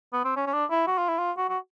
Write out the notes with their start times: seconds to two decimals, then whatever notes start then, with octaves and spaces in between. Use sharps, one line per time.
0.13 B3
0.25 C4
0.36 C#4
0.46 C#4
0.53 D4
0.70 E4
0.87 F#4
0.98 F4
1.08 E4
1.18 F4
1.37 F#4
1.49 F#4